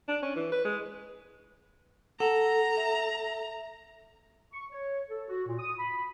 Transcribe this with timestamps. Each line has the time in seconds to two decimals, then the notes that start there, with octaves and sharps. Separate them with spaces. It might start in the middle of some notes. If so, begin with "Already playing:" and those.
0.08 D4
0.22 C#4
0.36 E3
0.52 B4
0.65 G#3
2.20 A4 F#5 A#5
2.77 E5
4.53 C#6
4.72 C#5
5.09 A4
5.29 F#4
5.48 A#2
5.59 D#6
5.79 B5